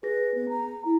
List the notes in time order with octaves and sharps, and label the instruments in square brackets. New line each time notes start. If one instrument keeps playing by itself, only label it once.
[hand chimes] G#4 A#6 [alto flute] B4
[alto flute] B3
A#5
E4